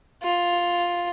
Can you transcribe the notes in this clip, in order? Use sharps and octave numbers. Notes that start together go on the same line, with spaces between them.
F4